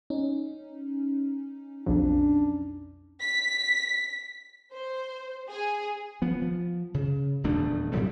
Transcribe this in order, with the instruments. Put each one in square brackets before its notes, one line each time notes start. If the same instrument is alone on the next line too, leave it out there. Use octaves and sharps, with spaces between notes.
[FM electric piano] C#4 D#4
[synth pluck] B1 F2 [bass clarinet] D4
[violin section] B6
C5
G#4
[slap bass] F3 B3
F3
C#3
D#1 E2 A3 D4
A2 C3 F#3 G3